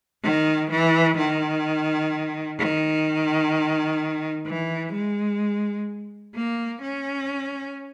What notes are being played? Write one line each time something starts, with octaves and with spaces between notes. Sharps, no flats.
D#3
E3
D#3
D#3
E3
G#3
A#3
C#4